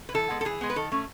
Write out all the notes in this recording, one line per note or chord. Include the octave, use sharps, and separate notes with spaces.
B4
E3 A4
G#3 B3
A4
E3 G#4
G#3 B3
B4
D#3 A4
A3 C#4